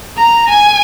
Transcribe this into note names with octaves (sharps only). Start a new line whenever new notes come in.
A#5
G#5